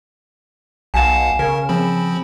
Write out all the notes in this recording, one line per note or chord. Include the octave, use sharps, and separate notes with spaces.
B1 F5 F#5 G#5 A5 E7
C#3 A#4
F3 C4 B5